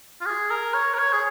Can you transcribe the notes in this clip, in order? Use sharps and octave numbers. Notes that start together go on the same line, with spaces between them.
F4
G#4
A#4
C#5
A#4
C#5
G#4